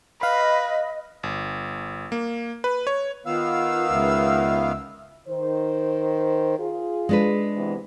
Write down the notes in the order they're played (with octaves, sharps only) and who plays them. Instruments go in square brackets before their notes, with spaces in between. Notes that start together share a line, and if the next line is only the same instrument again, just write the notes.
[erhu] B4 [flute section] D#5 [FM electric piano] F5 B5
[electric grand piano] G1
A#3
B4
C#5
[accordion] D#3 B3 F5 [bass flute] F4 [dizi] E6
[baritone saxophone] C#2 [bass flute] E5
[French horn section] D#3 C5
F4 G#4
[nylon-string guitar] G#3 D4 B4
[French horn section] C3 E3 B3